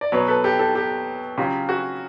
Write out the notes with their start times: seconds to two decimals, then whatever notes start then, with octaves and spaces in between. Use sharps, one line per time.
0.01 D5
0.12 B2 F#3 B4 C#5
0.28 A4 B4
0.44 G4 A4
0.59 G4 A4
0.75 G4 A4
1.38 C#3 F#3 F4 G4
1.69 F#4 G#4